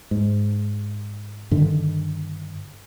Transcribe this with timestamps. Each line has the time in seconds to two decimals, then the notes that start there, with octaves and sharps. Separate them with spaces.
0.11 G#2
1.51 G2 D3 D#3